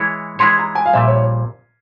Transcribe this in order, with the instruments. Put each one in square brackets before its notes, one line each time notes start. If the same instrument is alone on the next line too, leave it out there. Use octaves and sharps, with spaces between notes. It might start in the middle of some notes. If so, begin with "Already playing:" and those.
Already playing: [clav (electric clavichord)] E3 G#3 E4 G#4 C#5 [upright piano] C#6
[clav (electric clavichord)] E3 G#3 E4 G#4 C#5 [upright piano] C6
[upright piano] A#5
G#5
F5
[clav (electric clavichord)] A#1 A#2 G3 [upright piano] E5
[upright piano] C#5